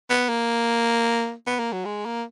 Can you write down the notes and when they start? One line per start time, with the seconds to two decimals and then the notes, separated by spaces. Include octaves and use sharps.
0.10 B3
0.29 A#3
1.47 B3
1.59 A#3
1.72 F#3
1.85 G#3
2.05 A#3